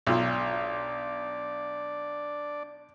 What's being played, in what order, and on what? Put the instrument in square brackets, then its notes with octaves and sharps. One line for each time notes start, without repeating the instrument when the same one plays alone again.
[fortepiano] B1 F4 [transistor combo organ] D4 D5